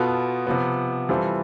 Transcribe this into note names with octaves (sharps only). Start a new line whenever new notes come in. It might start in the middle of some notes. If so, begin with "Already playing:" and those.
Already playing: B2 B3 F4 A4
C3 F3 B3
E3 G3 C4 F4 A4